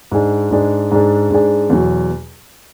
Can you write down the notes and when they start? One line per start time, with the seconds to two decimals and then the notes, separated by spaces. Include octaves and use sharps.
0.12 G#2 G#3 D4 G#4
0.51 G#2 G#3 D4 G#4
0.91 G#2 G#3 D4 G#4
1.31 G#2 G#3 D4 G#4
1.70 E2 B2 F#3